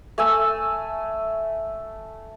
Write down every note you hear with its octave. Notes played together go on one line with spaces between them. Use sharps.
A3 G#5 E6